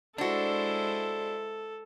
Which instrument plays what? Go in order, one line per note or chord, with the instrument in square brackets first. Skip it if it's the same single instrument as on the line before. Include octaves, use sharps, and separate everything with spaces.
[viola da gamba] G#3 E4 C5 [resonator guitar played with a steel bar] D4 F#4 [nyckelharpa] A4